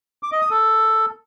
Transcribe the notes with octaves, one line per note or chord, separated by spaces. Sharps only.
D6
D#5
D#6
A4